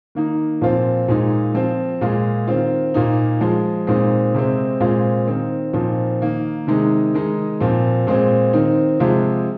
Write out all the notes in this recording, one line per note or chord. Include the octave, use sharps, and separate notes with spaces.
D#3 A#3 D#4
A#2 F3 C4 F4
A#2 G#3 D#4
F3 C4 F4
A#2 G#3 F4
D#3 C4 F4
A#2 A#3 D#4
F3 G#3 F4
A#2 G#3 C4 D#4
C3 G#3 C4
A#2 G#3 C4 F4
D#3 C4 D#4
A#2 F3 C4 D#4
D#3 A#3 D#4
C3 D#3 G#3 D#4
D#3 G#3 D#4
A#2 F3 C4
A#2 G#3 C4
D#3 C4 D#4
C3 F3 G#3 F4